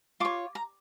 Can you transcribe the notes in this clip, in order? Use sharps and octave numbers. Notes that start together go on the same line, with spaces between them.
F4 C#5 D6
A#5